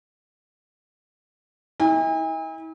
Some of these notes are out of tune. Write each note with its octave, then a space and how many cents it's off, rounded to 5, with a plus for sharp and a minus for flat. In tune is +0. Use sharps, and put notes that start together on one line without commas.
E4 -45 G#5 -45